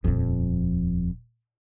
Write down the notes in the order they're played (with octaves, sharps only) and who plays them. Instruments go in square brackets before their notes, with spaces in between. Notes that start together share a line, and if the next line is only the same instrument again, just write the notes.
[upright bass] D#1 F3 [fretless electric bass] F2